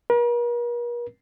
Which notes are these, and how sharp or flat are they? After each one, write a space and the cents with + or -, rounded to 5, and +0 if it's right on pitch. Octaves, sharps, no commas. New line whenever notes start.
A#4 +45